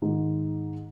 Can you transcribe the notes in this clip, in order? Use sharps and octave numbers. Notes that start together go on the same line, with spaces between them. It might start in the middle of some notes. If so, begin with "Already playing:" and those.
G#2 D#3 G#3 D#4